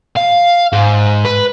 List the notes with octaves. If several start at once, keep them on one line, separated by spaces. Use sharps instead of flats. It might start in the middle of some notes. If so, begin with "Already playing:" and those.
F5
G#2
B4